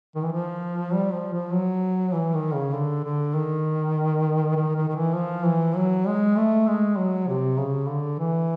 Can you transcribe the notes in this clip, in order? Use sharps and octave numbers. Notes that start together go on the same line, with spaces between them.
D#3
E3
F3
G3
F3
F3
F#3
E3
D#3
C#3
D3
D3
D#3
D#3
D#3
D#3
E3
F3
E3
F#3
G#3
A3
G#3
F#3
C3
C#3
D3
E3